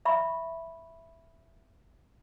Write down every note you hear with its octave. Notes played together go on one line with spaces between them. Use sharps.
E5 B5 C#6